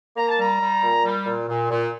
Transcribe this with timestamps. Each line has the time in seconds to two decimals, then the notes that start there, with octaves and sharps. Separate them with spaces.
0.17 A#3 A#5
0.29 A5
0.39 G3 A#5
0.61 G3
0.83 A#2
1.05 G3
1.26 A#2
1.49 A#2
1.71 A#2